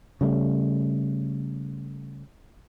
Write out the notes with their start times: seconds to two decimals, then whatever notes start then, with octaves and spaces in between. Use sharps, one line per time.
0.21 C#3 G3 A3